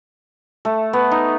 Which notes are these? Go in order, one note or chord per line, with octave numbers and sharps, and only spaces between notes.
A3
B3
D#4